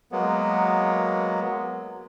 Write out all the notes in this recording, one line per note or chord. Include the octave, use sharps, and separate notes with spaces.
F#3 G#3 A#3 B3